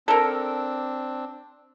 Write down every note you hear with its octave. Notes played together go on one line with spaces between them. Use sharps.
C4 D4 A4 A#4